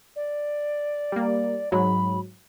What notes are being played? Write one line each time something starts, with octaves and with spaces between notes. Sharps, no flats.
D5
G3 A#3
G#2 F#3 B5